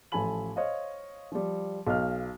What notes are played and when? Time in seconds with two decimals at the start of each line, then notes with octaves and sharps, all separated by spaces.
0.12 A1 F3 A4 G#5 B5 F#7
0.56 C5 C#5 D#5 F5
1.32 F3 G3
1.87 B1 D#5 F5 F6